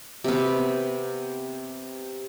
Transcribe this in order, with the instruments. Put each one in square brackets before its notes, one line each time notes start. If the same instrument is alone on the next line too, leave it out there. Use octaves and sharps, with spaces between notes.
[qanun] C3 B3